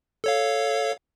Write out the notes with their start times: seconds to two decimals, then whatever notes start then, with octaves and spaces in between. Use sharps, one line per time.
0.24 A4 C#5 F5